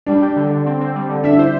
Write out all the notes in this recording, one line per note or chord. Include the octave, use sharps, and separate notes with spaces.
G3 D4
G4
D3
D3
C4
C4
G3
D3
D4 E5
E4 C5